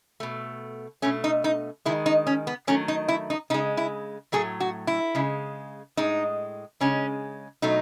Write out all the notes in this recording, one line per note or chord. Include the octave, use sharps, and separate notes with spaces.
B2 A3
B2 A3 C#4
D#4
D#4
D#3 G#3 E4
D#4
C#4
B3
D#3 F#3 A3 C#4
D#4
E4
D#4
C#3 G#3 D#4
E4
A2 F#3 A3 G#4
F#4
E4
C#3 G#3
A2 G#3 D#4
C#3 G#3 C#4
B2 F#3 A3 D#4